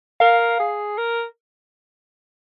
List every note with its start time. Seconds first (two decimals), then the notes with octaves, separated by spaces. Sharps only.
0.20 A#4 F5
0.60 G#4
0.98 A#4